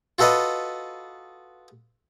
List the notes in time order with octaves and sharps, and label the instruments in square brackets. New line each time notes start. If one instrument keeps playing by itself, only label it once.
[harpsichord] F4 F#4 A4 B4 D#5